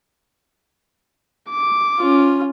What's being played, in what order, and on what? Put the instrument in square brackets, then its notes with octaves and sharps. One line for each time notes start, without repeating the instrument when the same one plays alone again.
[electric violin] D6
[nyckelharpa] C#4 F4